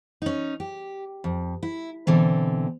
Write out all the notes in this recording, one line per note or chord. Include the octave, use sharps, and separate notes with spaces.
C#4 D#4
G4
F2
E4
B2 D3 E3 C4